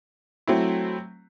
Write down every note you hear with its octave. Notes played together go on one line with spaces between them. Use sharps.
F#3 A3 C4 E4